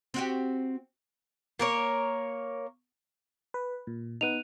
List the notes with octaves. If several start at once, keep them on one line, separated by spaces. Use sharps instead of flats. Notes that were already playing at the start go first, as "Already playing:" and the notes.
C4 F#4 G4
A#3 A#4 C#5
B4
A#2
B3 D#4 F#6 D#7 F7